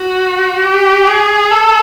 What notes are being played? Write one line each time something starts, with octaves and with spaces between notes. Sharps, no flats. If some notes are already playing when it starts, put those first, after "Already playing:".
Already playing: F#4
G4
G#4
A4